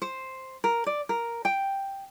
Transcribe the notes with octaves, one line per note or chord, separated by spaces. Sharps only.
C5
A#4
D5
A#4
G5